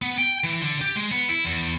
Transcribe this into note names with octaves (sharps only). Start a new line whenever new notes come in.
B3
G5
E3
D3
G4
G#3
B3
E4
E2